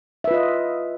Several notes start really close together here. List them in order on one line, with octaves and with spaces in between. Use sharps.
E5 B4 F4 D#5